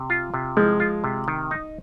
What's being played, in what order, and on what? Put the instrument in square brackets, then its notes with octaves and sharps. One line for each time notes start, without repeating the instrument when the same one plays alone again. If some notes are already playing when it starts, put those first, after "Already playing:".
Already playing: [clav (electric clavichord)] C3
F4
C3
[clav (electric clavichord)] F3 [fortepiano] G#3
[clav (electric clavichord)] F4
C3
D#3
D#4